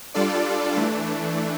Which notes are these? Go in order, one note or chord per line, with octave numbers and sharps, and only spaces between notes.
G3 D4 F4 A4 D5
E3 A3 D4